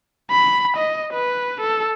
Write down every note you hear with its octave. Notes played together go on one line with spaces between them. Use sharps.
B5
D#5
B4
A4